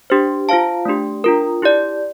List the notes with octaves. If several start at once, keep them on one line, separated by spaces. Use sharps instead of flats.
D4 G4 C5
F4 C5 F5 A5
A3 D4 G4
D4 F4 A#4
E4 G4 D5